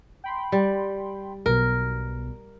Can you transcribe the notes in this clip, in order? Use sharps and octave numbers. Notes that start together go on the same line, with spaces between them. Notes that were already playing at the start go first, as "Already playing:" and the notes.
G5 B5 C6
G3
B1 B2 A#4